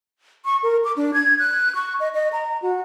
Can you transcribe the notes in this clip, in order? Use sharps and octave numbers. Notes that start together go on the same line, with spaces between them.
C#6
A#4
D6
D4
G#6
F#6
C#6
D#5
D#5
A#5
F#4